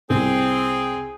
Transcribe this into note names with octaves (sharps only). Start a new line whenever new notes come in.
C2 C4 G#4